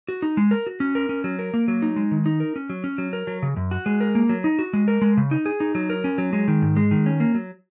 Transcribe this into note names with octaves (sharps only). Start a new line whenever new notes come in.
F#4
D#4
G#3
A#4
F#4
C#4
A#4
C#4
F#3
A#4
A#3
F#3
D#4
G#3
D#3
D#4
A#4
C#4
F#3
C#4
F#3
A#4
F#3
C#3
F#2
F#4
G#3
A#4
A#3
F#3
D#4
F#4
G#3
A#4
G#3
C#3
D#4
G#4
D#4
F#3
A#4
C#4
F#3
G#3
D#3
G#2
G#3
D#3
C#4
A#3
F#3